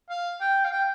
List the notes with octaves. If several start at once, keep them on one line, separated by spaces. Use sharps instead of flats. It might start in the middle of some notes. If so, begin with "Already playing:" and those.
F5
G5
F5
G5